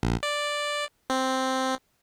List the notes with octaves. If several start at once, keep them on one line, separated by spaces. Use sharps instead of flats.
A#1
D5
C4